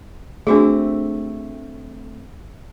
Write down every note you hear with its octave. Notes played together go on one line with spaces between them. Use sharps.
A3 C4 D4 F#4 G#4